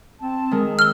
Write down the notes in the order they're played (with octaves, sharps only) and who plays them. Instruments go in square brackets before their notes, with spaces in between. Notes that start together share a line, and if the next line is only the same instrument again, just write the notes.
[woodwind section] C4 A5
[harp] D#3 G#3 A#4
[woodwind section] F#3 E6 [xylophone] F6 G7